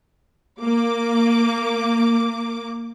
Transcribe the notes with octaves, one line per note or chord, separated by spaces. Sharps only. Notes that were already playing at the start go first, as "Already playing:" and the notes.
A#3 D6